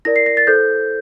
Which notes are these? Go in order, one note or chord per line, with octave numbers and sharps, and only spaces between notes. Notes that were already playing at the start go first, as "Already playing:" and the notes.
E4 A#4 D5 A#6
C7
A#6
A6
E4 A4 C5 G6